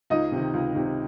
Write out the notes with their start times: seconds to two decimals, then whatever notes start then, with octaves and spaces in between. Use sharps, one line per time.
0.10 C#2 D#4 D#5
0.32 C3 D#3
0.54 C#2
0.75 C3 D#3